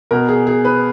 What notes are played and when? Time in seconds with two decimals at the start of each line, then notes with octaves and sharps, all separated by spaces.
0.11 B2 A#4
0.29 G#4
0.47 G#4
0.65 B4